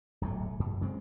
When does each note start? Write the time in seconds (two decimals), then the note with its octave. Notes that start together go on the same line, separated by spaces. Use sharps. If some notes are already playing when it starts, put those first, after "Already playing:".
0.21 D1 B1 G#2 A3
0.60 F#2
0.81 C#3 G#3 C4